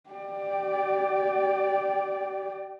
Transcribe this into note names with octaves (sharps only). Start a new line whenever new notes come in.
G4 D5